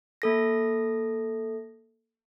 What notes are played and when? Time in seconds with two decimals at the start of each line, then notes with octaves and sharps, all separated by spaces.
0.22 A#3 A4 A#6